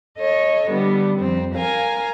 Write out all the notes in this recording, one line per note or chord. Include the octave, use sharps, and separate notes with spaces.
A4 C#5 D#5
D3 G3 B3
F2 C4
A#4 F5 G#5 A#5